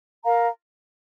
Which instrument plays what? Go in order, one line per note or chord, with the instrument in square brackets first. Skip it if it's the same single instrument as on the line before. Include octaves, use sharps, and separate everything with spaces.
[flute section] A#4 F5 A#5